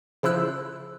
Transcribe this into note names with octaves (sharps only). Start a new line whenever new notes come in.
C#3 F3 E4 E6 F#6